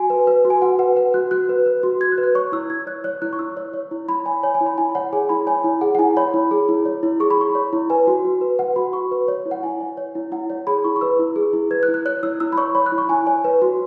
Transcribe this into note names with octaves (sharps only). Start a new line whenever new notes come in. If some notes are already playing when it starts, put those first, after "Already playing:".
Already playing: F#4 G#5
B4
B4
F#4
G#5
F#4 F#5
B4 F#5
B4 F#5
F#4 F#6
F#4 F#6
B4
B4
F#4
F#4 G#6
F#6
B4
F#6
C#5 C#6
E4 E6
E4 G#6
C#5 F#6
C#5 F#6
E4 F#6
C#6
E4 E6
C#5
C#5
E4
E4 B5
C#5 G#5
C#5 G#5
G#5
E4
B5
E4 G#5
C#5 F#5
G#4 G#5
E4 B5
C#5 G#5
E4
G#4 F#5
F#5
E4 G#5
C#5 B5
E4
G#4
E4
C#5
E4
G#4 C#6
B5
E4 C#6
C#5
E4
B4 G#5
F#4
F#4
B4
B4 F#5
F#4 B5
F#4 C#6
B4
C#5
E4
F#5
E4 G#5
C#5
C#5
E4
E4 F#5
C#5
G#4 B5
E4 C#6
C#6
B4 E6
E4
G#4
E4
B4 G#6
F#6
E4
F#6
C#5 F#6
E4 E6
E4 E6
B5
C#5 C#6
C#5 B5
F#6
E4
C#6
E4 G#5
C#5 G#5
B4
F#4